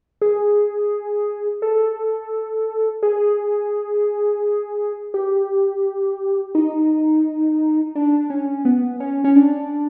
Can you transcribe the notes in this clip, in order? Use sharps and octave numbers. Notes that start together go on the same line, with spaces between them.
G#4
A4
G#4
G4
D#4
D4
C#4
B3
C#4
C#4
D4